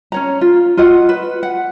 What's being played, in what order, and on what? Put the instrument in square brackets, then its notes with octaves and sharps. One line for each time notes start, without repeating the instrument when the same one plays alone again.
[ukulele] C#4 C#5 A#5
F4
F4 F#4 D#5 F#5
B4
F#5